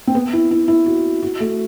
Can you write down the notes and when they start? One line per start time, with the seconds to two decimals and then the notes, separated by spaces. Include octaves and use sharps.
0.07 C4
0.15 B3
0.33 E4
0.51 E4
0.68 E4
0.86 F#4
1.23 F#4
1.40 A3